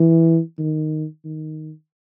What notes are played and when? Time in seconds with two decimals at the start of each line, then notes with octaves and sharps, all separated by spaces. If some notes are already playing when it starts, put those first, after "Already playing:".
Already playing: E3
0.59 D#3
1.25 D#3